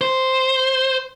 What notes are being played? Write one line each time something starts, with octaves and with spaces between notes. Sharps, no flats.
C5